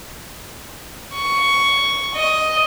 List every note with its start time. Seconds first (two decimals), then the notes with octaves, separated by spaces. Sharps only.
1.15 C#6
2.15 D#5